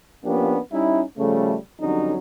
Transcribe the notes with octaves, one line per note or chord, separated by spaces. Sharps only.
F3 A#3 B3 C#4 D4 G4
G3 C#4 D#4 E4
C#3 F3 G3 A3
F2 D3 F#3 G3 C#4 D#4